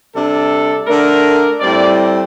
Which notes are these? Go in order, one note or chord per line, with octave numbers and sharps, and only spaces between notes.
C3 G3 D4 A4
D3 A3 D4 A#4
A2 G3 C4 D5